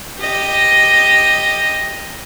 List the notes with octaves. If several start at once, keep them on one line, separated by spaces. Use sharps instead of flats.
G4 D#5